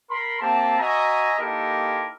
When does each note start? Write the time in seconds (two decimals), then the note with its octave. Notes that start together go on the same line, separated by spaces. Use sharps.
0.10 A#4 B5 C6
0.40 A#3 C4 G4 A5
0.79 F#4 D#5 E5 G#5 A#5
1.39 A#3 D#4 E4 G4 A4 A#4